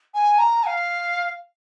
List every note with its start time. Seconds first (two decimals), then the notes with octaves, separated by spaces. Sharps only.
0.14 G#5
0.38 A#5
0.62 G#5
0.66 F5